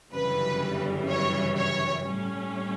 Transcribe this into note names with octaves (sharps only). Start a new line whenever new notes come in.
G1 F#2 C#3 E3 G3 B4
C#5
C#5
A2 G3 C#4